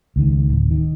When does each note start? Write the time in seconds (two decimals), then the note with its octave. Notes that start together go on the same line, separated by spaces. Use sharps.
0.16 C#2 D#3
0.49 D1
0.71 D#3